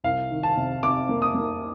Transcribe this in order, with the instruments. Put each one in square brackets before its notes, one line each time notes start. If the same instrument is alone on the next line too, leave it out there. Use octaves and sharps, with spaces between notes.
[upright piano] C2 F5
D#3
A5
C3
C3 D6
A#3
D#6
A#3